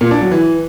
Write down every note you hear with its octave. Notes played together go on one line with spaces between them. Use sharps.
A#2
D4
F#3
E3